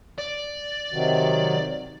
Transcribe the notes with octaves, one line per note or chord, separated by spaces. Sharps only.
D5
C3 D#3 F#3